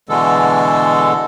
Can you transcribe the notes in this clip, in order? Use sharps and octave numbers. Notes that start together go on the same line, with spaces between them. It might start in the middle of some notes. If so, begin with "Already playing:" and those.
B2 D3 E3 G#3 A4